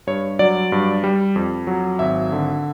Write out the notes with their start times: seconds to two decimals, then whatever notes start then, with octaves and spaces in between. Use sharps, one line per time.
0.07 G2 C#5
0.39 F#3 D5
0.72 G2
1.04 G3
1.36 F2
1.67 F#3
1.99 G#1 E5
2.32 D3